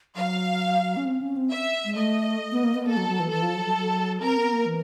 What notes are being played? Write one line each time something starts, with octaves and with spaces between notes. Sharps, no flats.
F#3 F5
C#4
C4
C#4
C4
E5
G#3
A3 D#5
B3
A#3
B3
A#3 A4
F#3
F#3
E3
E3 A4
F3
F#3
F#3
F#3
C4 A#4
B3
A#3
E3